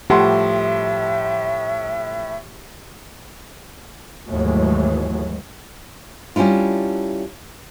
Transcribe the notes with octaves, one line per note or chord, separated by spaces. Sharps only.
A2 F3 G4 E5 F#5 C6
D#2 G#2 E3 F#3 G#3 A3
G3 C#4 D4 E4 F4